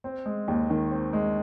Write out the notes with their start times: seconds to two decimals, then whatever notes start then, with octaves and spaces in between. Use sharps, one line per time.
0.04 C4
0.26 G#3
0.48 D#2
0.70 D#3
0.91 C4
1.13 G#3